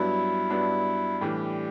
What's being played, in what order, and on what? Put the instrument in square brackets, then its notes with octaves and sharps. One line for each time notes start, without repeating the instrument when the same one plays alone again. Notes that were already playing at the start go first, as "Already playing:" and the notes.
Already playing: [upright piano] G2 F#3 B3 D4 [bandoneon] E4
[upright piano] G2 F#3 B3 D4
[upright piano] A2 E3 G3 D4 [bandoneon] G4